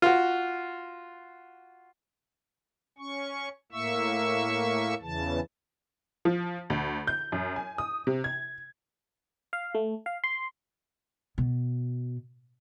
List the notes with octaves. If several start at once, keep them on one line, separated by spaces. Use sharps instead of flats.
F4 F#4
C#4 C#6
A2 A#3 E5 C#6 E6
E2 C#3 E3 A5
F3
D2
G6
F#2
G#5
D#6
C3
G#6
F5
A3
F5
C6
B2